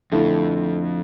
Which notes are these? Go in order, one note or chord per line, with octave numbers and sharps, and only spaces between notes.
F2 D3 A3 E4